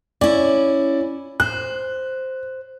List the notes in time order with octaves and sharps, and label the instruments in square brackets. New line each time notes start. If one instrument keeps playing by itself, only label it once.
[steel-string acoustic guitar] C#4 E4 [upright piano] D5
[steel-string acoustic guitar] C5 [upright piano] F#6